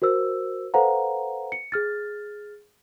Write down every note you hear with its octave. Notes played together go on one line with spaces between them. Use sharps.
F#4 A#4 C5 E6
A4 B4 C5 F5 F#5 A#5
C#7
G#4 F6 A6